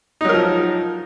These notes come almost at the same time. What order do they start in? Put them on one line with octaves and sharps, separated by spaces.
D#4 F#3 A#4 F3